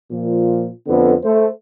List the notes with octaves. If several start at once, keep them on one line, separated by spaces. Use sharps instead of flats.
A#2 F3
F2 D3 B3
A3 C5